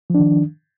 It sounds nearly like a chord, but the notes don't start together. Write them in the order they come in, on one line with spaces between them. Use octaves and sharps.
F3 D4 D#3